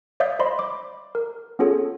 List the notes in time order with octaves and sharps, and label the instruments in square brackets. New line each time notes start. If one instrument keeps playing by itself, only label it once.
[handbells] C#5 D5 E5 F5 D#6 G6
C5 D5 D#5 B5 C6
D6
A#4
B3 C#4 F4 G#4 A4 C#5